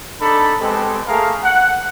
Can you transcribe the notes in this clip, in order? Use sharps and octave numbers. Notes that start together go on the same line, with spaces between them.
D4 D#4 A4 B5
G#3 B3 C4 G4 A4
A3 A#3 G#4 A#4 F5
F#5